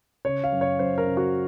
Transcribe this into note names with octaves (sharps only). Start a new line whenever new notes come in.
C#3 C#5
F5
F#2
C#5
F#2 C5
A#4
C#3
F#4